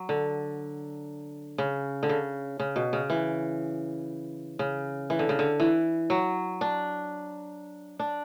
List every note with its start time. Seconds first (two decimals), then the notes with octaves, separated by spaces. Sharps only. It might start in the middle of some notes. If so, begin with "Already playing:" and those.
Already playing: F#3
0.09 D3
1.58 C#3
2.03 D3
2.09 C#3
2.60 C#3
2.76 B2
2.93 C#3
3.10 E3
4.59 C#3
5.10 E3
5.19 D3
5.29 C#3
5.39 D3
5.60 E3
6.10 F#3
6.61 D4
7.99 D4